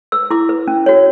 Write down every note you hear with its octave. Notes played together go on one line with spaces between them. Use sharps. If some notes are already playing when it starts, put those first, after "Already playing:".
B4 E6
E4 D6
B4
C#4
F#4 C#5